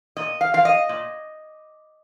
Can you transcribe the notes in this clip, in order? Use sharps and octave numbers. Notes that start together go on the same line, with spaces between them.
A#2 D#5
F5
F3 F5
D#5
A#2